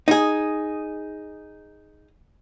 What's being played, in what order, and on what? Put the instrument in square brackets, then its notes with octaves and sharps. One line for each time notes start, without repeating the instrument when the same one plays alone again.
[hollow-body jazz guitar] D#4 G#4